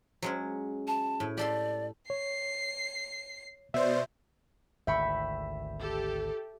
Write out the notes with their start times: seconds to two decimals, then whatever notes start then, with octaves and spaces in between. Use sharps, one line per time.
0.22 F#3 G#3 C#4
0.87 A5
1.20 A2
1.37 G4 A4 D5 C6
2.10 C#5 C7
3.74 B2 C5 D5 E5
4.87 G#1 D2 E5 G5 B5 C#6
5.79 G4 A4